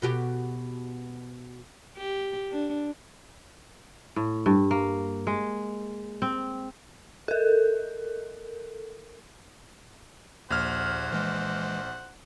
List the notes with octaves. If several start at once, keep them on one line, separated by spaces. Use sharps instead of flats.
B2 F#4 G4
G4
D4
A2
G2
A#3
G#3
C4
A4 A#4
A#1 D#2 C5 F#5 F6 G#6
E3 G#3